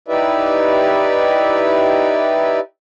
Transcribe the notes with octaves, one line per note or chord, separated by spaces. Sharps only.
D#4 E4 G4 B4 D5 E5